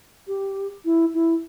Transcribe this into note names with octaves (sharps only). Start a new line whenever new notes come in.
G4
E4
E4